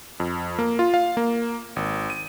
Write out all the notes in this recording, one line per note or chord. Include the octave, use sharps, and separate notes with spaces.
F2
A#3
F4
F5
A#3
G#1
D#7